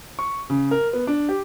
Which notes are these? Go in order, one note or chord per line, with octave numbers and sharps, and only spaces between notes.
C#6
C#3
A#4
B3
D4
G4